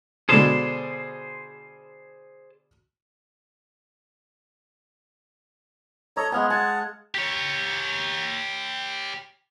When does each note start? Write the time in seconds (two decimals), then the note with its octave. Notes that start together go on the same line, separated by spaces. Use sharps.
0.29 B2 D3 G#3 G#4 C5 A5
6.17 A4 C#5 D#5 A#5
6.32 G#3 B3 F5 G#5
6.50 F#5 G#5 A5
7.15 G4 C#5